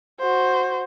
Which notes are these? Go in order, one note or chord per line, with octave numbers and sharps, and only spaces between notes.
F#4 C5